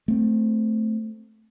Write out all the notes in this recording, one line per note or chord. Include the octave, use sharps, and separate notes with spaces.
A3 C4